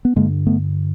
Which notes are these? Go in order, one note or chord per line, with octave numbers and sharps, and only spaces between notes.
B3
G2 D3 G#3 A#3
A3 B3